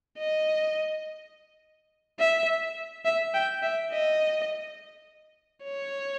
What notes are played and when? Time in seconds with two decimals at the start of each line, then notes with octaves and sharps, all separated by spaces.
0.19 D#5
2.19 E5
3.05 E5
3.34 G5
3.63 E5
3.92 D#5
5.64 C#5